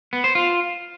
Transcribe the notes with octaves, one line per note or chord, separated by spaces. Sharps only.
B3
C5
F4